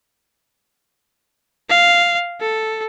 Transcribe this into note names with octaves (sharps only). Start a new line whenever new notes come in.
F5
A4